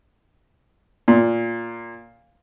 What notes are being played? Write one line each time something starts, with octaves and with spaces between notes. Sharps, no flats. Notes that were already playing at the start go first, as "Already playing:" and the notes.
A#2